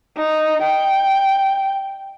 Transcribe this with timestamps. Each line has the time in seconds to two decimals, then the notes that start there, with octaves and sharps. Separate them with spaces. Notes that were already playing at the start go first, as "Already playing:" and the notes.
0.17 D#4
0.62 G5